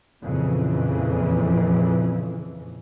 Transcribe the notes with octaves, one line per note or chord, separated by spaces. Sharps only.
F2 A#2 C#3 E3